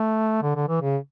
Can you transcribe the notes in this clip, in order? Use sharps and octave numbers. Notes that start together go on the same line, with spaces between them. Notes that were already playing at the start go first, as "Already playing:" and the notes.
Already playing: A3
D3
D3
E3
C#3